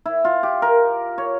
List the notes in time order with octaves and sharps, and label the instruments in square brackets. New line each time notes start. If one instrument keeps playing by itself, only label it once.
[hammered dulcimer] E4
F4
G4
A#4
C#5